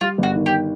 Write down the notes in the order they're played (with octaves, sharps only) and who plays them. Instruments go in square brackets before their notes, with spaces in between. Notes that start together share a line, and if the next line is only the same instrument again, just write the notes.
[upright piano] G3 [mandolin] F4
[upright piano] G1 [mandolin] F#4
[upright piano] D#3
[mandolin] G4